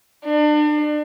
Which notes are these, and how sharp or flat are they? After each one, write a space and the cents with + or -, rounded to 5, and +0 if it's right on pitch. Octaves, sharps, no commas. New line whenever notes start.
D4 +35